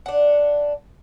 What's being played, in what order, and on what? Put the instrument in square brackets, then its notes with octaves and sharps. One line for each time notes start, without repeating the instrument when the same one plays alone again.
[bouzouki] D4 F#5